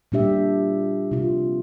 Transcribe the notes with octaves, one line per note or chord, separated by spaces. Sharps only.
A#2 G3 D4 G4 E5
C3 F4